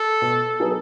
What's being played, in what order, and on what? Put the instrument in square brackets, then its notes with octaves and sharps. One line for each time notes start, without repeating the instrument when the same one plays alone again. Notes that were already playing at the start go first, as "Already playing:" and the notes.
Already playing: [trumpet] A4
[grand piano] B2
F#3 B3 D#4 G#4